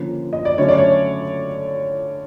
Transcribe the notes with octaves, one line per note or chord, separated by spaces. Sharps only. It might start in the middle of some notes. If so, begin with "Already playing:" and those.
Already playing: D3 F3 A#3 C#4
D#5
D5
D3 F#3 A3 C#4 C#5
D5
C#5